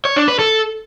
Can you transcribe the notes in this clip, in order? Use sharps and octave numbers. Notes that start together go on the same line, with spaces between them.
C#5
D4
B4
A4